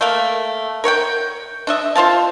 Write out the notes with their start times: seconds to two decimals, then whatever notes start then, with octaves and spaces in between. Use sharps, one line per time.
0.01 A3 A#3 F5
0.84 A#4 C#5 F#5 G5
1.67 D4 D#5 E5
1.96 F4 C5 F5 A5